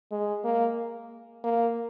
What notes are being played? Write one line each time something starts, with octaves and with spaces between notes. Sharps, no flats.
G#3
A#3
A#3